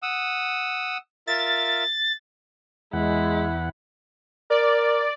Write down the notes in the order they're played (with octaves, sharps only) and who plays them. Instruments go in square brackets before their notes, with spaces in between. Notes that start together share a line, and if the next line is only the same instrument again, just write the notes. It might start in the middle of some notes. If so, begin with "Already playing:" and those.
[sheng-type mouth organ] F#5 D#6 E6
[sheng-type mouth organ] F4 A#4 E5 [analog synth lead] A6
[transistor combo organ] E2 F#5 [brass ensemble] G#3 [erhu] E4
[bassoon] A#4 [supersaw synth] D5